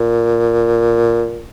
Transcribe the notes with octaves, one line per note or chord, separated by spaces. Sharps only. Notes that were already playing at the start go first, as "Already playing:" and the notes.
Already playing: A#2